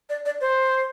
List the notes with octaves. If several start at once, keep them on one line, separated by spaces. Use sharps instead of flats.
D5
D5
C5